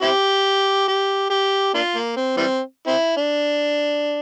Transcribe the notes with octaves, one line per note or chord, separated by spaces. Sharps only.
C4 E4 G4
G4
G4
A#3 D4 F4
A#3
C4
E3 G3 C4
C4 E4
D4